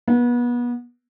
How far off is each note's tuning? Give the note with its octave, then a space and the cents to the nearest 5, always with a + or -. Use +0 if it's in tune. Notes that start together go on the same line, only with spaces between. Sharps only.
B3 -30